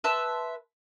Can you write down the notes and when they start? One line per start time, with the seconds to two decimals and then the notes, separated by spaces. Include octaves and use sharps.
0.04 B4 E5 A5 C6